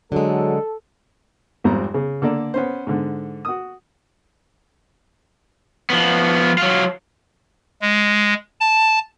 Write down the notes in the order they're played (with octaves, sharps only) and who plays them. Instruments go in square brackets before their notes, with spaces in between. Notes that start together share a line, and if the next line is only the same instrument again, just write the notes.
[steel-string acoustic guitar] D3 G#3 [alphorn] F#3 [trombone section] A4
[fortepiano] G#1 F2 G3 G4 A#5
C#3
D3 A#3 A4 D5
B3 C#4 C5
G#2 D3
F#4 D#6
[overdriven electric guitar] F3 B3
F#3 F4
[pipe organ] G#3
A5